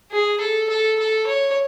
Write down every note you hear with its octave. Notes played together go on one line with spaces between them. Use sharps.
G#4
A4
A4
A4
C#5